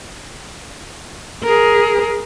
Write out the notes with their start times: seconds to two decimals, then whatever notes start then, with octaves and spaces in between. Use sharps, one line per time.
1.44 G#4 A#4